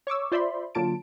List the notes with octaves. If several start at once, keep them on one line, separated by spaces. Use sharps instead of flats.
C#5 C#6 D6 E6
F4 C5 D5 E5 B5 C6
D3 F#3 A#3 F4 A5 D7